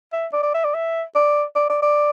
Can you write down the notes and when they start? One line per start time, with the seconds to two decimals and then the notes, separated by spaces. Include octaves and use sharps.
0.13 E5
0.33 D5
0.43 D5
0.54 E5
0.65 D5
0.75 E5
1.15 D5
1.56 D5
1.70 D5
1.82 D5